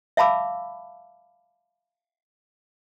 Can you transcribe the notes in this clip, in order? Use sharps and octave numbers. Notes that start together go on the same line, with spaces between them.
E5 F5 A5 B5 D6 E6